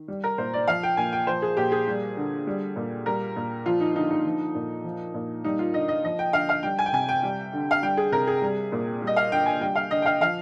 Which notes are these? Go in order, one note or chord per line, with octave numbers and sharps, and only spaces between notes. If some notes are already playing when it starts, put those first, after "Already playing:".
Already playing: D#3
G3
A#4
A#2 C5
D5
F3 F5
G5
A#2 G#5
G5
F3 C5
G#4
A#2 G4
G#4
G3
D3
G3
A#2
G3 A#4
A#2
F3 F4
D#4
D3 D#4
D#4
F3
A#2
F3
A#2
G3 D#4
F4
D3 D#5
D#5
F3 D#5
G5
D3 F5
F5
G3 G5
G#5
G5
C3 G#5
G5
G3
D3
F5
G3 G5
G#4
C3 A#4
G#4
G3
A#2
G3
D#5
F5
D3 G5
G#5
G3 G5
F5
D3 D#5
G5
F5
F3 F5